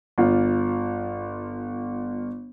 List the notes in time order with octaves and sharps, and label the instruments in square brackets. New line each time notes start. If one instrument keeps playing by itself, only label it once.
[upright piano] G1 F4